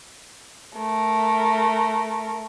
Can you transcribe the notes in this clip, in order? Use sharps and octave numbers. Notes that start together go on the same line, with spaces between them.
A3 A#4